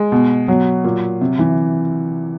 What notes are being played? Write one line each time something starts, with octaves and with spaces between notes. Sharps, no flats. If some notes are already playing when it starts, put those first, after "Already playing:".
Already playing: G#3
B2
B2 F#3
A#2
C3
E3